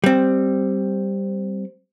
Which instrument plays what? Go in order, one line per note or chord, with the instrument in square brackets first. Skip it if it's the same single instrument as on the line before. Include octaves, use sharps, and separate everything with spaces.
[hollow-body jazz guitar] G3 C4